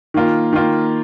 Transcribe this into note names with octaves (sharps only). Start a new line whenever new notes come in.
D#3 A#3 F4
D#3 A#3 F4